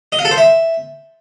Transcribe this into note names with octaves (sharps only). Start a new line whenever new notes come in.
D#5
F5
A4
C5
E5